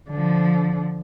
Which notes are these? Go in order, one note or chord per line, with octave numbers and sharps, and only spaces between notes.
D3 F3